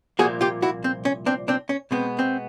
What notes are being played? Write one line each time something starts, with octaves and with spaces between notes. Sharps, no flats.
C2 A#2 F3 A#3 F#4 G#4
F4 G4
E4 F#4
C4
C#4
C4 D4
C4 D4
C#4
B2 G#3 B3 C4
C4